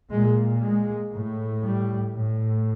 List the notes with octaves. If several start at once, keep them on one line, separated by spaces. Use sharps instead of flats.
A#2 G#3
G#3
A2
G3
A2